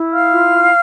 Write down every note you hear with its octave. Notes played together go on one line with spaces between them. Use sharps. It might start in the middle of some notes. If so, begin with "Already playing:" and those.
Already playing: E4
F5 F6
F4